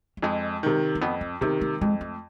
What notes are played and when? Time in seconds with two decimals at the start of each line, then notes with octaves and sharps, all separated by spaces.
0.17 G3
0.23 F2 G#3
0.63 C3 D#3
0.95 A#3
1.01 F2 B3
1.21 C4
1.41 C3 D#3 B3
1.61 A3
1.81 F2 G#3
2.01 A3